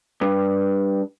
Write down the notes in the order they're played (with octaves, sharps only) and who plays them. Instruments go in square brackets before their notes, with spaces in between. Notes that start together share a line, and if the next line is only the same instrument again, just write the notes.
[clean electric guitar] G2